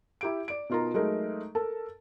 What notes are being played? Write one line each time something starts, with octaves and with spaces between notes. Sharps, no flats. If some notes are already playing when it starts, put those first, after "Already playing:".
E4 G4 D7
D5 D7
B2 D#4 F4 A#4 A#5
F#3 G#3 A3 D#4 G#4 A#4
A4 A#4 A5